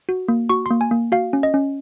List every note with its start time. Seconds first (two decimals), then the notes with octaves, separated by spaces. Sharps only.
0.09 F#4
0.28 A#3
0.49 F#4 C#6
0.66 A#3 C6
0.81 G#5
0.91 A#3
1.12 F#4 F5
1.33 C#4
1.43 D#5
1.54 C#4